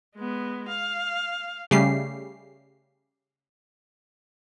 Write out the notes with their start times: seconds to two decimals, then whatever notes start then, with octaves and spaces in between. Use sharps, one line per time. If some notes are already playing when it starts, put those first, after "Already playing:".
0.16 G#3 B3
0.68 F5
1.71 C#3 G3 A3 C#4 G4 C7